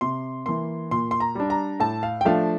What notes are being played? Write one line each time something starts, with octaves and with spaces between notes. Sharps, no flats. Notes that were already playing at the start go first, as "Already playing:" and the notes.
C3 C6
E3 A#3 C6
A#2 C6
C6
A#5
G3 D4
A#5
A2 A5
F5
G5
F3 A3 D4 F5